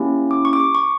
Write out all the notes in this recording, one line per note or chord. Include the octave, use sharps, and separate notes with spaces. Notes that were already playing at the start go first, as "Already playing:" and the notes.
Already playing: A#3 C#4 E4 G4
D6
C#6
D6
C#6
C#6